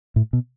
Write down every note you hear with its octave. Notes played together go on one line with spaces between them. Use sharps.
A2
B2